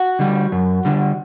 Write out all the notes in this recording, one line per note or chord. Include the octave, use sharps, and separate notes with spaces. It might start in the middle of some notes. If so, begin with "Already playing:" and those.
Already playing: F#4
D3 G3
F#2
D3 G3